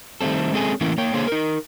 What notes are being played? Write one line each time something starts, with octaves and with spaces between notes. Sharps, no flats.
D#3 G3 A3 C4 A4
G#3 C4 C#4 G#4 A4 G#5
E3 A3 A#3 C#4 E4
A#3 C#5 G5
D3 A#3 G#4 C5 C#5
D#4 A#4